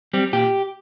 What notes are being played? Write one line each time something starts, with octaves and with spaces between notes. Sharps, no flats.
G3 C4
A#2 G4